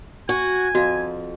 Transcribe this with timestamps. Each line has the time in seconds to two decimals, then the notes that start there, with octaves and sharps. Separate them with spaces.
0.29 F#4 G#5
0.75 F2 F#4 F5